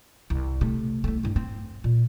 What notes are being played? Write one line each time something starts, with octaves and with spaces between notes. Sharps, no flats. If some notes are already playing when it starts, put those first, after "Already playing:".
C2
C3 A3
C2 A3
G2 E4
C4
A#2